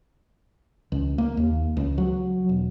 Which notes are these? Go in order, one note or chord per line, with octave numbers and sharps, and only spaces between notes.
C#2
A#3
D#2
C#2
F#3
E1